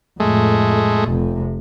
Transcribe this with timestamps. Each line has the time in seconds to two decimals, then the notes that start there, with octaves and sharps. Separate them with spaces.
0.20 F2 A2 G#3 A3
1.05 F1 C3